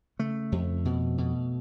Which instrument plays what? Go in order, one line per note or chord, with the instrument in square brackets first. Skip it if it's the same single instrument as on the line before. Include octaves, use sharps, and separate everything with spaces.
[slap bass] C#3 A3
F2
B2
B2